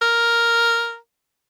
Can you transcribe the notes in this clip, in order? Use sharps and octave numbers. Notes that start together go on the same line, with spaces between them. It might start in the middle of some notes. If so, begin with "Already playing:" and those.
A#4